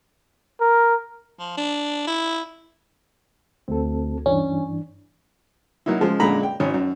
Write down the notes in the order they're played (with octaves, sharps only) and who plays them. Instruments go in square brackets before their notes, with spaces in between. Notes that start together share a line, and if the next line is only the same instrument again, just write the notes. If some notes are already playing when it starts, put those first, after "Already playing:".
[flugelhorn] A#4
[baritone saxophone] F3
D4
E4
[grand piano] D2 [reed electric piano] C4 A4
[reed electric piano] G2 E3 D4 [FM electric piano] C#4 [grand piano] C#5
[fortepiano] F#3 A#3 D#4 E4
C#3 F3 G#3
F#2 A#2 D3 G#3 A#5 B5
G5
G#1 C#4
F#2